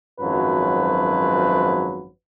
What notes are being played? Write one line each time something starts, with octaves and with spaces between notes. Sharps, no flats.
G#1 F#2 F3 F#3 B4